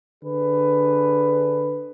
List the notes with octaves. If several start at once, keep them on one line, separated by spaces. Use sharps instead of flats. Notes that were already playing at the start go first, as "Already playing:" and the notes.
D3 G#4 B4